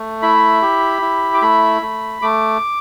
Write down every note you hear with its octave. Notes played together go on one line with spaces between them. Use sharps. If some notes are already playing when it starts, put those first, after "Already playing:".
Already playing: A3
E4 B5
G4
E4
D6
A3 B5
A3
A3 D6